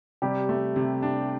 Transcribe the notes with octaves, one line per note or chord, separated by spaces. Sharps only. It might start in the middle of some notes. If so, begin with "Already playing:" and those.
C3 G3 G4
A3
C3
D4